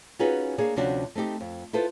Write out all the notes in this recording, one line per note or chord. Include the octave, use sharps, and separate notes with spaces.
C#4 D#4 F4 F#4 G#4 B4
A#3 D4 G#4 C#5
D2 C3 F3 C#4 D4 F#4
A3 C4 D#4 G4
F2
E4 F4 A4 B4 C5